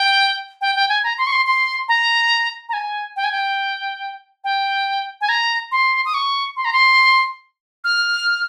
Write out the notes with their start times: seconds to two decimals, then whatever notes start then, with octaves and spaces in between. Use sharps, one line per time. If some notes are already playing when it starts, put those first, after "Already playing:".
Already playing: G5
0.61 G5
0.76 G5
0.89 G#5
1.04 A#5
1.18 C6
1.27 C#6
1.32 C6
1.46 C6
1.88 A#5
2.69 A#5
2.73 G#5
3.16 G5
3.24 G#5
3.32 G5
4.44 G5
5.21 G#5
5.29 A#5
5.72 C6
6.05 D#6
6.14 C#6
6.56 C6
6.65 A#5
6.73 C6
7.84 F6